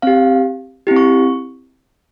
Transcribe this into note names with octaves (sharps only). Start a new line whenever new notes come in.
C4 G4 F5
C4 E4 G4
C#6